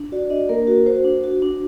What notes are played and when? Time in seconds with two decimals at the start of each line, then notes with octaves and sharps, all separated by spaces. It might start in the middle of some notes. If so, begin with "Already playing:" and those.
Already playing: D4
0.12 F#4 D5
0.30 D4 D#5
0.49 A#3 A#4
0.67 F#4
0.86 F#4 C5
1.05 D4
1.24 F#4
1.42 D4